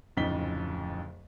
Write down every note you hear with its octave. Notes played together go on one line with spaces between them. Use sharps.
D1 F2 C#3 D#4 B6 G7